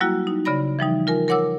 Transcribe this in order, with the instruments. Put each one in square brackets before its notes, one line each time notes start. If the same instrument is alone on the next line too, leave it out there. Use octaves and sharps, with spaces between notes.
[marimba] F#3 G3 A#3 E4 F#4
D#4
C#3 D5 B5 A#6
E3 F3 G3 D#4
F4 A#4 G#5
A#4 C#5 F#5 D6 E6